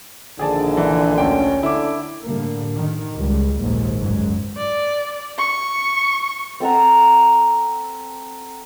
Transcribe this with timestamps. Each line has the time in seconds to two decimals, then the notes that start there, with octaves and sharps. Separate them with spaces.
0.39 A#1 D3 D#3 G#4 D5 A5
0.77 E3
1.18 D2 C#4 G5
1.63 D3 E4 D6
2.24 A2 D3 G3 A#3
2.75 D#3
3.15 C#2 G3
3.58 A#1 D#2 G#2
3.98 F#1 C#2 G#2 F#3
4.57 D5
5.38 C#6
6.60 C4 A4 F#5 A#5